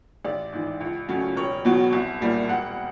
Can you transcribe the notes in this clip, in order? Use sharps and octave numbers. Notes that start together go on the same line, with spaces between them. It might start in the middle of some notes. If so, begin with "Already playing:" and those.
A1 D5
G#2 E3
C#2
C#3 F#3 A3 C#4
E1 C#5
E2 B2 F#3
C2
A#2 G3 A#3
E1 F#5